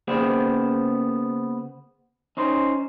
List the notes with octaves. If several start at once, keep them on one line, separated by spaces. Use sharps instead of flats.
C#3 A#3 B3 G#4 C5 G5
C#4 D#4 C5